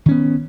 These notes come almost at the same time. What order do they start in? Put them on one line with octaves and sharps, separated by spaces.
D#3 C#4 B3